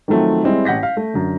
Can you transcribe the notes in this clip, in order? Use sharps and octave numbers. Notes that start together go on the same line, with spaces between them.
D#3 F3 F#3 A3 C4
G3 G#3 C4 E4 G#4
A1 F#5 G6 A#6 B6
F5
A3
F#2 D3